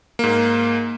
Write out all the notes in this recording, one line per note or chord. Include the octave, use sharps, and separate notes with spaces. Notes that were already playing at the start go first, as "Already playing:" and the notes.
G#2 A#3